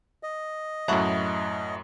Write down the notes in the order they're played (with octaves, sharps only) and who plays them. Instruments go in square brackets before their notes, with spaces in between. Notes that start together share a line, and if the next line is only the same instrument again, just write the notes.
[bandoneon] D#5
[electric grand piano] F#2 A2 A5 [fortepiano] F#3 [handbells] E5 B5 C#6